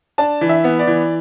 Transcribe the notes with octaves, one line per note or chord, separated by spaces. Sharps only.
D4 A5
E3
E5
B3
D5
E3